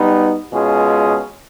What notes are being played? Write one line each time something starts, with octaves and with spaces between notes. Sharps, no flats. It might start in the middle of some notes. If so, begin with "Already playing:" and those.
Already playing: B2 G3 B3 D#4
B2 G#3 C#4 F4 G#4